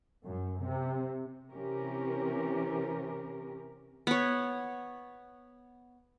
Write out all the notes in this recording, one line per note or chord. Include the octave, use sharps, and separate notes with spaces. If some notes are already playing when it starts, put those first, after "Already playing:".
F#2
C3
C3 E3 C4 C#4 G4 A#4
B3 C#5